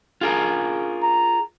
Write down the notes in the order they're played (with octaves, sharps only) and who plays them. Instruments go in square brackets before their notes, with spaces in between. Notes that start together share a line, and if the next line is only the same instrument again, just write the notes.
[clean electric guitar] F4 G#4 A#4
[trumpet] A#5